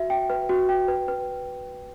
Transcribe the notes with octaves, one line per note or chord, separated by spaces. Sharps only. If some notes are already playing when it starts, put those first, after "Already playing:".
Already playing: F#4 E5
G5
B4
F#4
G5
B4
B4